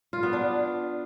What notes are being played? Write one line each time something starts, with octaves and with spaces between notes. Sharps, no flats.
F4
B3
D4